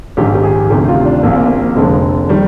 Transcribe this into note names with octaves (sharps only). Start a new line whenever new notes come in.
A#1 G#2 D#3 G4
G4
G#4
D2 C3 D#3 G4
F4
D4
A#1 A#2 A#3
C4
A#3
F1 F2 D3 G#3
D#3 G3